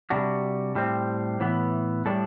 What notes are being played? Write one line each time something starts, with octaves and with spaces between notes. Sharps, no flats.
C3 G3 D4 F#4
A2 G3 C4
A2 E3 B3
A2 G3 D4 A4